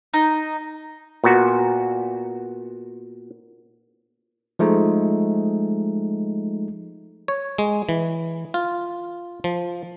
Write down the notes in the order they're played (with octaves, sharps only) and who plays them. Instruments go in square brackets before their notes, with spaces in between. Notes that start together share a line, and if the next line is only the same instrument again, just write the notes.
[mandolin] D#4
[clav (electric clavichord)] A#2 B3 F#4
[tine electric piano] F3 G#3 A3 D#4
[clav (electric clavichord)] C#5
G#3
E3
F4
F3